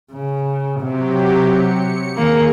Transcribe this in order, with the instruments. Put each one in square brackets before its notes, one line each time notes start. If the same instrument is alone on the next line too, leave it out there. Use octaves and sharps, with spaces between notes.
[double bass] C#3
[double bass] C3 [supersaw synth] F#3 G4
[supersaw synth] C#7
[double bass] D#3 [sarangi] A#3 [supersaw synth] G#4